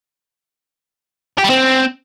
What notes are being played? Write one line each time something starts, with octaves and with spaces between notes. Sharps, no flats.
G4
G3
C4